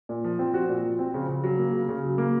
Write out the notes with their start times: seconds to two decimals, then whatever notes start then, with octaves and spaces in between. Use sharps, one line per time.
0.09 A#2
0.24 F3
0.39 C4
0.54 F#4
0.69 A#2
0.84 F3
0.99 C4
1.14 C#3
1.28 C#3
1.44 F#3
1.58 A#3
1.73 C#3
1.89 C#3
2.04 F#3
2.18 A#3